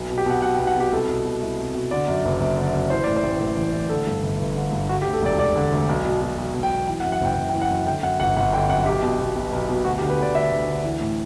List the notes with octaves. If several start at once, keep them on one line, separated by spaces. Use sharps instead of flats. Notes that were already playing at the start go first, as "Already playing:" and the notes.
Already playing: B1
B2
G4
B2 F#5
B1 F#5
G5
B1
F#5
B2 G4
C2 A4
B2
B2
C2
C2
B2
D3 D5
F#2
F#1
F#1
D3
F#2
E3 C5
A2 D5
C5
A1
A1
E3
A2
D3 A4
G2
G1
G1
D3
G2
D3 F#4
G4
D2
A4
E1 D5
E1 D5
D3
D2
B1
B2
B2
B1
B1
G5
B2
E3 G5
F#5
F#2
F#5
F#1 G5
F#1
G5
E3
F#5
F#2
D3 G5
F#2 F#5
G1 F#5
G1 F#5
D3 G5
F#2 F#5
B1 G4
B2
B2
B1
B1
B2
D2 F#4
G4
D3
B4
D3 D5
D2 E5
D2
D3
E3
A2